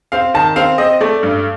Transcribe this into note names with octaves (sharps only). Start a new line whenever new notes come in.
C4 F5
D#3 A5
C4 F5
C4 D#5
A3 D5
G2